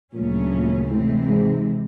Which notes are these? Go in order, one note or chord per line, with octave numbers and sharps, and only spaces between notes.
D2 A#2 C#3 F#3 A3 C#4
A#2
A2 C3 E3 G#3 C4
G#2